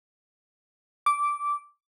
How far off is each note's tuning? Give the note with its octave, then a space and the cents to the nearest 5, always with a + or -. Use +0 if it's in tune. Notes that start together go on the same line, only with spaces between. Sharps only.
D6 -10